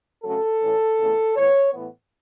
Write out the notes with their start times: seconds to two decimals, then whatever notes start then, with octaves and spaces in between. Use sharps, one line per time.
0.23 C#3 F#3 A3 A4
0.61 A2 E3 C#4
0.98 E2 C#3 A3
1.35 A2 E3 B3 C#5
1.72 A2 E3 B3